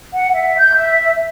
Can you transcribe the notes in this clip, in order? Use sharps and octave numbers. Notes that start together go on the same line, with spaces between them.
F#5
E5
G6
E5